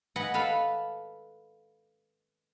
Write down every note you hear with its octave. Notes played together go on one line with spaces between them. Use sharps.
B4 D#5 F#5 G#5
A4 B4 F5 B5